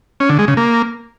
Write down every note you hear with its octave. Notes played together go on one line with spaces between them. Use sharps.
C#4
D3
G#3
C#3
A#3